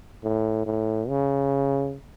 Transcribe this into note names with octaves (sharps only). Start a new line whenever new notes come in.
A2
A2
C#3